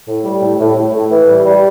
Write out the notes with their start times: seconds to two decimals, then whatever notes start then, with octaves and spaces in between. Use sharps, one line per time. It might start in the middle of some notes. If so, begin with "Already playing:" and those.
0.08 A2
0.25 G3
0.42 A2
0.60 A2
0.76 A2
0.93 A2
1.11 E3
1.27 G3
1.45 G3